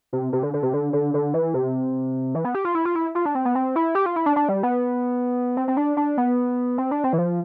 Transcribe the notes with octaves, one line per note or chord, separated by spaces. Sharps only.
C3
C3
D3
D3
C3
D3
D3
D3
E3
C3
E3
B3
G4
F4
E4
F4
E4
F4
D4
C4
B3
C4
E4
G4
F4
E4
D4
D4
G3
B3
C4
C4
D4
D4
B3
C4
D4
C4
E3
F3